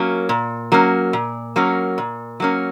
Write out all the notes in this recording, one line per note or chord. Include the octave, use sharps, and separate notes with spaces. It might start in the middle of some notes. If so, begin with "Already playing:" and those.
Already playing: F#3 A#3 C#4
A#2
F#3 A#3 C#4
A#2
F#3 A#3 C#4
A#2
F#3 A#3 C#4